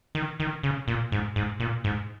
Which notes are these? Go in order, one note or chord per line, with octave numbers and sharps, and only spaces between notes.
D#3
D#3
C#3
A#2
G#2
G#2
A#2
G#2